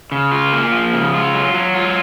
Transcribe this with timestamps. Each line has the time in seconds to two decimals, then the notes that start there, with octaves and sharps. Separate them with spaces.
0.12 C#3
0.32 F4
0.52 A#3
0.73 F3
0.93 C#3
1.14 F4
1.33 F#3
1.54 F#3
1.74 F4